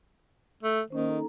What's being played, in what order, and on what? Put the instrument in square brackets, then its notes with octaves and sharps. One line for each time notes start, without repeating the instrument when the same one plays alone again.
[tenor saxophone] A3
[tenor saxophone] D#3 [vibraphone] A#3 C#4 C5
[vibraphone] D#4 A4 A#5